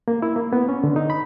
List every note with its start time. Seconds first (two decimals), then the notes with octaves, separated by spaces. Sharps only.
0.08 A#3
0.22 E4
0.36 A#3
0.53 B3
0.69 C#4
0.84 D3
0.96 D#4
1.10 B5